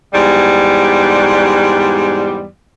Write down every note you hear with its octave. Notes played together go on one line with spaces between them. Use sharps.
E2 G#2 G3